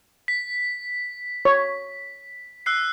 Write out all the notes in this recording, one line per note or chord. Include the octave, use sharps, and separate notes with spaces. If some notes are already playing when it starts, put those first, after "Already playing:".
B6
C#5
E6 F#6 C7